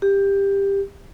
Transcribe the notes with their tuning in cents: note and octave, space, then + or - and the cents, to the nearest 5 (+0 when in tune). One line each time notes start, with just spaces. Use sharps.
G4 +15